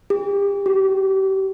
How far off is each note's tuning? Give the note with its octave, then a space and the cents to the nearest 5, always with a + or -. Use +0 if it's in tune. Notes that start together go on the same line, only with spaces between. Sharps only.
G4 +35
G4 -35